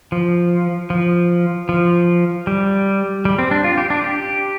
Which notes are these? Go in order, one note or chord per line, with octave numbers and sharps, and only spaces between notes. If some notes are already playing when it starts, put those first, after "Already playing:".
F3
F3
F3
G3
G3
C4
D4
F4
G4
D4
G4